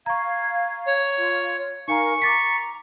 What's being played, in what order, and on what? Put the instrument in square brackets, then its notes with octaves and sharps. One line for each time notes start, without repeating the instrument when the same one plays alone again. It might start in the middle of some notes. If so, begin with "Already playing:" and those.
[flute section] F5 G#6 [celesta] A#5 C#6
[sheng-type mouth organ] C#5
[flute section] F4
[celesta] D#4 G#5 A#5 [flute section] A#4 F5 [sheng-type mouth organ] C#6
[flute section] A#5 [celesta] D6 A6 B6